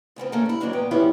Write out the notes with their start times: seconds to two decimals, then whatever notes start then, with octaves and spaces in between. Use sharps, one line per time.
0.16 D2 C#3 B3 C4
0.32 A3 A#3 C#4
0.46 G3 E4
0.60 F#2 E3 F#3 A#3 D4 D#4
0.73 A#2 B3 G5
0.91 E3 F3 G3 B3 C#4 E4